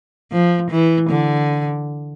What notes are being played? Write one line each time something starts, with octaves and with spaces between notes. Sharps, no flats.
F3
E3
D3